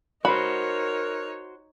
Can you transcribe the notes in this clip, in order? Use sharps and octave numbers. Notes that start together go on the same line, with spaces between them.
D#4 F#4 A#4 C5 C#5 B5